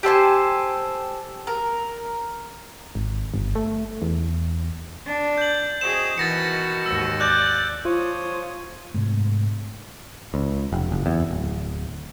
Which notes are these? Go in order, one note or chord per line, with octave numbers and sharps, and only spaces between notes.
G4 A4 C5 G#5
A#4
G#1
G1
A3
E2
D4
G6 F#7
C4 F#4 G#4 D#5 E7
B2 D#3 E3 F#4 A6 A#6 C#7
D#2 G#2 E6
D5 F#6 G6
F3 F4 C5 C#5 D#6
G#2 C3 A3
C#2
F1
F#1
E2
D1